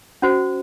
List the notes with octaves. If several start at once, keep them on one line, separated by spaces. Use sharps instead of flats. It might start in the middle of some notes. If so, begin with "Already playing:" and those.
C#4 F#4 C5